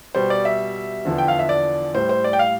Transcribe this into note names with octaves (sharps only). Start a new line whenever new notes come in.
B2 G3 C5
D5
E5
E2 D3 F3
G5
F5
E5
D5
A2 G3 C5
C5
D5
G5
F5